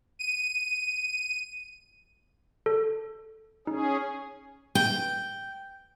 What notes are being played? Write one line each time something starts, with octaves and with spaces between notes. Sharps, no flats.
D#7
A4
C#4 D#4 G#4
G5